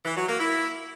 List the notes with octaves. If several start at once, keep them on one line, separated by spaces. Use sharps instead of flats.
E3
F#3
A#3
E4